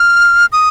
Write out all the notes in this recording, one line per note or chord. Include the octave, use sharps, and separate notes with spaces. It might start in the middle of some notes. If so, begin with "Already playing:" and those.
Already playing: F6
D#6